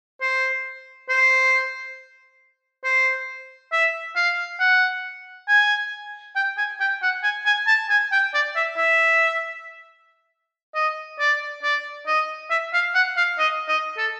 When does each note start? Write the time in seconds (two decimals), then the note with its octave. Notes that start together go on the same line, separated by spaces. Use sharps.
0.21 C5
1.10 C5
2.84 C5
3.72 E5
4.16 F5
4.60 F#5
5.48 G#5
6.36 G5
6.58 G#5
6.80 G5
7.03 F#5
7.23 G#5
7.46 G#5
7.67 A5
7.90 G#5
8.12 G5
8.34 D5
8.56 E5
8.77 E5
10.75 D#5
11.19 D5
11.63 D5
12.07 D#5
12.51 E5
12.74 F5
12.95 F#5
13.17 F5
13.39 D#5
13.68 D#5
13.98 A4